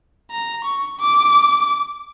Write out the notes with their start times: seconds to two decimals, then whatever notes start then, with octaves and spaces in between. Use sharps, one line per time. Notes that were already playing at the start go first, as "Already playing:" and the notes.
0.31 A#5
0.65 C#6
0.99 D6